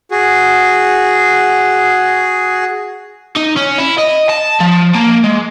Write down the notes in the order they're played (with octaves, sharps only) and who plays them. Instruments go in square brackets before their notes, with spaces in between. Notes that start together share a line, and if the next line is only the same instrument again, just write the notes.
[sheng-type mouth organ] F#4 G#4
[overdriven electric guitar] D#4
C#4
E4
D#5
A5
F3
A#3
G#3